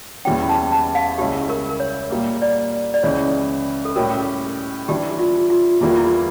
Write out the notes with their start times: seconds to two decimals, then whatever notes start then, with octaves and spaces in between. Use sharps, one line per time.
0.25 E2 E3 G3 C#4 G5
0.49 A5
0.72 A5
0.95 F5
1.18 C#2 C#3 G3 C#4 E4 G4
1.49 A#4
1.69 A#4
1.80 C#5
2.10 A#2 G3 A#3
2.42 D5
2.94 D5
3.03 C#2 C#3 E3 C#5
3.85 A4
3.96 A2 G3 C#4 G4 A#4
4.88 E3 G3 D4 G4
5.19 F4
5.50 F4
5.81 E2 E3 G3 A#3 E4
5.89 F4
5.97 E4